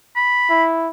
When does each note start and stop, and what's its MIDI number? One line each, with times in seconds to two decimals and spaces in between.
0.16 0.64 83
0.50 0.90 64